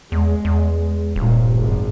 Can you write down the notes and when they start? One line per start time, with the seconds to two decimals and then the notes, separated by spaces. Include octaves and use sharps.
0.12 E2 G#3
0.45 E2
1.16 D#1 C2 G2 A#2
1.53 G#1 F#2